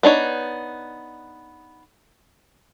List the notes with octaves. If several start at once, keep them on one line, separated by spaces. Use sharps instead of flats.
B3 D4 D#4 C#5